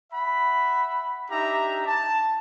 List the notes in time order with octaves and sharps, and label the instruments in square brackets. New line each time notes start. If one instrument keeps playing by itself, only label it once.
[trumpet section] E5 F#5 B5
D4 D#4 G4 E5 A#5
A5